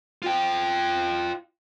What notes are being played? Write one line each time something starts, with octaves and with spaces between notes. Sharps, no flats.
F4 G5